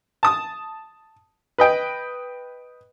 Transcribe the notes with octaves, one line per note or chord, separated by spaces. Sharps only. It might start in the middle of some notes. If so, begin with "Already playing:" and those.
A5 D#6
B4 D#5 G5